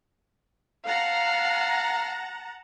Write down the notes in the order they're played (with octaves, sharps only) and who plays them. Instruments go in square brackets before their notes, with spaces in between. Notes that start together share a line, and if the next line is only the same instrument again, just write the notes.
[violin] F5 [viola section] F#5 A5 A#5